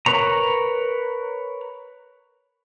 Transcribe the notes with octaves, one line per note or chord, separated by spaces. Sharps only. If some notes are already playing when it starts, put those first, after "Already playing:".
A#4 B4 C#5 A#5